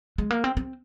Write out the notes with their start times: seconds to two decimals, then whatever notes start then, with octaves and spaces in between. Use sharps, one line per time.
0.18 G#3
0.31 A#3
0.44 C4
0.57 C4